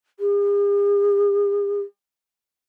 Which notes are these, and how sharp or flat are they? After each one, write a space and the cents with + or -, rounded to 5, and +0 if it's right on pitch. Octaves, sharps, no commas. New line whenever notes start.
G#4 -45